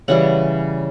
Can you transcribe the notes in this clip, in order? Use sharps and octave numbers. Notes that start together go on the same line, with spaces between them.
C#3 E3 G3 F#5